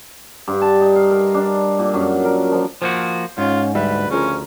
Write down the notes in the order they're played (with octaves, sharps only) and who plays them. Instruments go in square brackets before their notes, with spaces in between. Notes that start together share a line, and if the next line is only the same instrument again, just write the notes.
[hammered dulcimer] G2
A5
D#4
F5
A#4
D4
A#2
F#2
A#4
F3
[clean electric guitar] F3 A#3 F#4 [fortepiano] C5
[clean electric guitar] G#2 [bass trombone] C#4 [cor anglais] F4
[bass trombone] D2 [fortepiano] G3 E5 [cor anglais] B4
[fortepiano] C#3 F3 A#4 [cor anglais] C#4